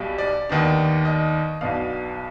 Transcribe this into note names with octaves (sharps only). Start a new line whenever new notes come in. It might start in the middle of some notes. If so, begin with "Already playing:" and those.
Already playing: B1 B2 G3
D5
D#2 D#3 B3 D4
D#5
B1 B2 B3 D4 F5